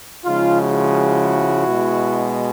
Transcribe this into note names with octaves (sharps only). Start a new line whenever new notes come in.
C#3 F3 G#3 D#4 F4
E4 F#4
B2 G#3